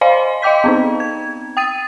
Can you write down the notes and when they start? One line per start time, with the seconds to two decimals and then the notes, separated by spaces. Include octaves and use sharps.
0.01 C5 D5 D#5 F5 G#5 C6
0.42 D#5 F5 G5 D6 G6 B6
0.64 B3 C4 D#4
1.00 G#6
1.57 G5 D#6 A6 D#7